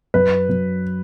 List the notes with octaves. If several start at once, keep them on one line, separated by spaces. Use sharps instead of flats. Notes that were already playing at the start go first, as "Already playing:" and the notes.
F#2 B4
F#2